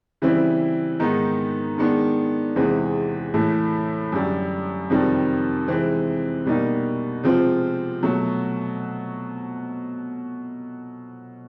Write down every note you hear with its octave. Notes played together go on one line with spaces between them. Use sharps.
C#3 E3 G3 C4 E4
G#2 D#3 G#3 B3 D#4
D#3 G#3 B3 D4
E2 C3 E3 G#3 C4
A2 E3 A3
F#2 D3 G3
F2 C3 D#3 G3
C3 E3 G#3 C4
B2 G3 A#3 D#4
C3 F3 G#3 C4 F4
B2 F#3 A3